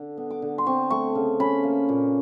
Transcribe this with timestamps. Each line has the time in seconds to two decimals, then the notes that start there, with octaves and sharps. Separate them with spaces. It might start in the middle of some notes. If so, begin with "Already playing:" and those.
Already playing: D3
0.17 B3
0.30 D6
0.42 D3
0.58 C6
0.67 C4 C#6
0.90 A3 C#6
1.15 C#3
1.40 C#4 B5
1.64 A#3
1.89 A#2